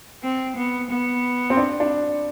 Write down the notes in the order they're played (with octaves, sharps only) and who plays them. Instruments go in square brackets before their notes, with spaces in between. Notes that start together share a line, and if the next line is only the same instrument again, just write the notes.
[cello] C4
B3
B3
[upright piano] C4
D4
D4